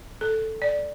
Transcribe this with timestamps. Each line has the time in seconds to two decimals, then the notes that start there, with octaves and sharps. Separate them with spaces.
0.21 A4
0.62 D5